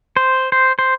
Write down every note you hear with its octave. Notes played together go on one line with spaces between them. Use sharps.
C5
C5
C5